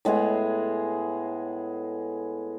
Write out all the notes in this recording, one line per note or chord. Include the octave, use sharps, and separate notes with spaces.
A2 G#3 B3 G#4